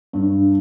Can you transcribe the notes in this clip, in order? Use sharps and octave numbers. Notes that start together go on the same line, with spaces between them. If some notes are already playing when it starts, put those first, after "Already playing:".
G2